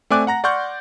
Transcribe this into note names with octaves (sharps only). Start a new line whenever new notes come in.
A3 C4 D5 G#5 D6 F#6
F#5 A#5 A#6
D5 F#5 C6 C#6 F6 G6